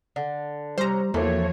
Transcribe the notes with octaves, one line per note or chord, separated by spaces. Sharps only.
D3
C3 G3 C#4 C5 A#5
E2 F3 A3 A#3 C4 F#4 C#5